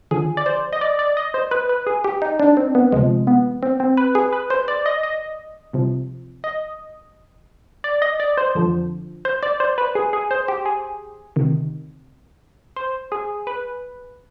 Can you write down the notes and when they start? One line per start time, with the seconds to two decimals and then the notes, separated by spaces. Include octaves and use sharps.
0.11 D#2 D3 F3 G#4
0.37 D5
0.46 C5
0.73 D#5
0.81 D5
0.99 D5
1.17 D#5
1.34 C5
1.51 B4
1.69 B4
1.87 G#4
2.04 G4
2.22 D#4
2.40 D4
2.57 C4
2.75 B3
2.92 D2 C3 F3 G#3
3.27 B3
3.63 C4
3.80 C4
3.97 B4
4.15 G#4
4.33 B4
4.50 C5
4.68 D5
4.86 D#5
5.03 D#5
5.73 C2 C3 F3
6.44 D#5
7.84 D5
8.02 D#5
8.20 D5
8.37 C5
8.55 F2 D3 F3
9.25 C5
9.43 D5
9.60 C5
9.78 B4
9.95 G#4
10.13 G#4
10.31 C5
10.48 G4
10.66 G#4
11.36 D2 C3 D#3
12.76 C5
13.12 G#4
13.47 B4